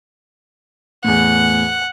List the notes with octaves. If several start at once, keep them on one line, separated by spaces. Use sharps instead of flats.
E2 A2 F#5